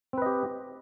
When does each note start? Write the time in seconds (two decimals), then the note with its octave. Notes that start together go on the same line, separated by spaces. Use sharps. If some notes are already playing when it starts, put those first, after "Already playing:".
0.13 C4
0.18 B4
0.22 D#5
0.26 G4